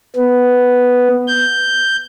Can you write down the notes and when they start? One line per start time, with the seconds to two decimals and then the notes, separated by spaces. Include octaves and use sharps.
0.16 B3
1.27 G6